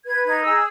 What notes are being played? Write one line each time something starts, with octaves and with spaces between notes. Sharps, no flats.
B4 G#6
D#4 G#6
G#4 E6